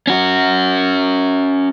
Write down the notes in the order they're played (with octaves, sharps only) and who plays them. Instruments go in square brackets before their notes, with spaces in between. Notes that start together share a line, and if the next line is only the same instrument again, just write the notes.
[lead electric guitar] C#4 F#4